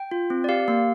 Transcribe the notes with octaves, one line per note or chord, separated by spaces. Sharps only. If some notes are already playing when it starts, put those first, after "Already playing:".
Already playing: G5
F4
C4
D5
G4 F5
A#3 F5